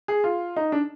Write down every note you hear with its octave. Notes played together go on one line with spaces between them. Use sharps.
G#4
F4
D#4
D4